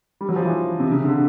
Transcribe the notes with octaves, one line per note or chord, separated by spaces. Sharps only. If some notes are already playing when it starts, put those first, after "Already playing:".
G3
F#3
F3
E3
C3
C#3
D3